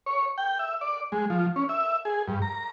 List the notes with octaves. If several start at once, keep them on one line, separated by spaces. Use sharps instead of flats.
C#5
G5
E5
D5
G#3
F3
C#4
E5
G#4
G2
A#5